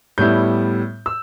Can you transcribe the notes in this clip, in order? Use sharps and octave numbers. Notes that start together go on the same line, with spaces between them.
A2 G3 B3 E4 G6
E6